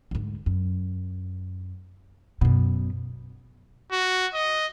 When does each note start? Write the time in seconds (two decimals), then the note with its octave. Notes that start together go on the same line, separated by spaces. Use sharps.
0.11 D2 G#2
0.46 F#2
2.41 F#2 B2
3.92 F#4
4.34 D#5